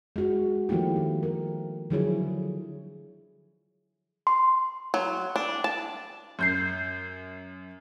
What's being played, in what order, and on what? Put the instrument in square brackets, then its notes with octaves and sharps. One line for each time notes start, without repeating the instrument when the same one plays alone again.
[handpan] G#3 F#4
D#3 F3 A3 A#3 E4 G4
G4
A#4
D3 F3 F#3 E4 G#4 C#5
[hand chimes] C6
[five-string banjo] F#3
D4
A5
[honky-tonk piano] F#2 G6 C7